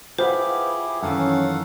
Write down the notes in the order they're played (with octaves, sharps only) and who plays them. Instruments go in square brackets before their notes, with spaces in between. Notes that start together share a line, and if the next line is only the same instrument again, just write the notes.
[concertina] E4 G4 G#4 [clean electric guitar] F4 B4 F#5 [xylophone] C5
[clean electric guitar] F#2 D#3 E3 [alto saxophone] C#4 [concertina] A4 F5 F#5